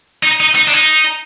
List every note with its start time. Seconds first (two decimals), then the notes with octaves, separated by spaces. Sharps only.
0.23 D#4
0.40 D#4
0.55 D#4
0.68 D4
0.73 D#4